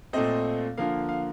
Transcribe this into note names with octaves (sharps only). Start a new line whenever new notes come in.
A#2 A3 C4 D#5
D3 F3 A#3 F5
F5